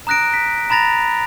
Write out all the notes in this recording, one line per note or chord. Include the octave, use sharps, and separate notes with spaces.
A#5 D#6 F#6 A#6 D7
B6
A#5 B5 A6 A#6 F7